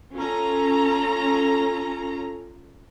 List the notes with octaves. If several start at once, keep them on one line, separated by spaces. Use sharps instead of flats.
C#4 F4 A4 A#5